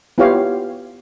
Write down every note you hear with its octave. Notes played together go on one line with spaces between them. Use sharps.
B3 E4 F4 G4 C#5 F5